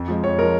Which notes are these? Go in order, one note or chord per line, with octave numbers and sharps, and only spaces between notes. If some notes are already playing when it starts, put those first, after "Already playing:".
Already playing: F2
F3 G#3
F2 C#5
F3 G#3 A#4